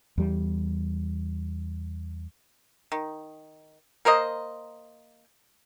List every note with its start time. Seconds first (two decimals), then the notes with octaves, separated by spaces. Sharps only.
0.18 E2 G3
2.92 D#3
4.05 A#3 A#4 C5 D#5